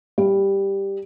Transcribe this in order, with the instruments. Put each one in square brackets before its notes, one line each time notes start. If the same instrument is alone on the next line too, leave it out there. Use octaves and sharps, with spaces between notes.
[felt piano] G3